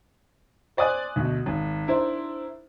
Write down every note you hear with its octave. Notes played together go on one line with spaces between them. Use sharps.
C5 D5 G#5 D#6 F#6
D2 B2
G#1
D4 E4 A#4 C5